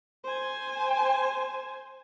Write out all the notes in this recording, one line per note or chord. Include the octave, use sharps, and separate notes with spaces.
C5 G#5